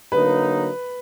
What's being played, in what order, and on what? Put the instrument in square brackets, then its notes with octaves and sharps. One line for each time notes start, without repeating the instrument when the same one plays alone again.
[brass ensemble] D3 F#3 A#3 D#4 [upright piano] B4